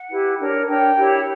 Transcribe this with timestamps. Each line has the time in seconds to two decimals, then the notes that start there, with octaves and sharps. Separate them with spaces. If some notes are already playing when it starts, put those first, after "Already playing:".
Already playing: F#5
0.11 E4 G4 B4
0.40 D4 A#4 C#5
0.68 D4 A#4 C#5 G5
0.97 E4 G4 C#5